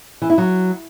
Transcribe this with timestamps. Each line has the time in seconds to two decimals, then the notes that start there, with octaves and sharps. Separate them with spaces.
0.22 E3
0.30 E4
0.38 F#3